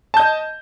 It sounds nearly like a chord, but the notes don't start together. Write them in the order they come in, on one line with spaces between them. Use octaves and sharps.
A5 G6 D#5